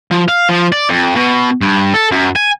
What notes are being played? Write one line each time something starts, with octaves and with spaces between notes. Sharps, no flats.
F3
F5
F3
D5
F2
B2
G2
A4
F#2
G#5